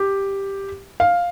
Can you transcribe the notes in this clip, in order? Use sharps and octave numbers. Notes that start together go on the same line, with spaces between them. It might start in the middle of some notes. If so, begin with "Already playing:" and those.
Already playing: G4
F5